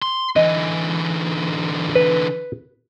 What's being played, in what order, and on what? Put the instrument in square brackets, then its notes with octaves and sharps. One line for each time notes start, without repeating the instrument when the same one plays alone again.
[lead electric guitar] C6
[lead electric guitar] D3 E3 [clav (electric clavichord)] D#5
[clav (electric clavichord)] B4